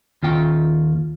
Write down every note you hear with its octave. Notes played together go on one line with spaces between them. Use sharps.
D#2 F4 G5